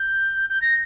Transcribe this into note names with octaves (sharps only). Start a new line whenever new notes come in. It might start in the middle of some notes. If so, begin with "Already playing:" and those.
Already playing: G6
G6
A#6